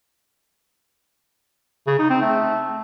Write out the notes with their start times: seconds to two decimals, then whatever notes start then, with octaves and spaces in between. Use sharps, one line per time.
1.87 C#3
1.99 D#4
2.10 C4
2.21 A3